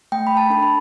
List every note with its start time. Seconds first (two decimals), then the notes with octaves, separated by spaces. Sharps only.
0.12 A3 G5
0.27 B5
0.37 A5
0.50 D4 A4 A5
0.62 B5